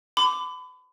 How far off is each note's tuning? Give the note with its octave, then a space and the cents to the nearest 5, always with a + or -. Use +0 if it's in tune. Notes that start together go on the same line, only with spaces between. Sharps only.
B5 +35 D6 +0